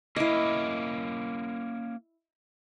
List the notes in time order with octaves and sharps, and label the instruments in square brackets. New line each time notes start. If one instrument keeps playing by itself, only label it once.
[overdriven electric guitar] A#3 C#4 [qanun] E4 D#5